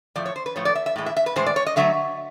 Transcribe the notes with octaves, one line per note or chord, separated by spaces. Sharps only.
A2 F3 A3 D5
C#5
C5
B4
A2 F3 A3 C#5
D5
E5
E5
A2 E3 G#3
E5
E5
B4
A2 E3 G#3 C5
D5
C#5
D#5
D3 F#3 A3 E5